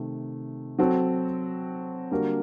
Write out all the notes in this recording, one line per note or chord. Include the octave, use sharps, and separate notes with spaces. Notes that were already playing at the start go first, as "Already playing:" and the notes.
Already playing: C3 D#3 A3
F#3 C4 F#4 A4
D3 G3 A#3 F#4 A#4